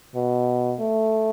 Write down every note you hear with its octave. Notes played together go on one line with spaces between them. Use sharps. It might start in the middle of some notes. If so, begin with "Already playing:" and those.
B2
A3